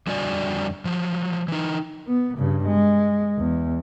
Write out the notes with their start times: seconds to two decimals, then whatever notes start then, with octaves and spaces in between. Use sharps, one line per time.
0.07 F2 D3 G3 F#4 D5 G#5
0.85 F3 F#3
1.48 E3 D#4
2.07 B3
2.38 G2 C#3
2.67 G#3
3.38 E2